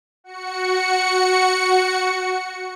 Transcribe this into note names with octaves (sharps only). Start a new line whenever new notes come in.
F#4 C#7